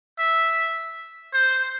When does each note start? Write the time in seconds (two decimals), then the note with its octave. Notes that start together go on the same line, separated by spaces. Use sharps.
0.19 E5
1.34 C5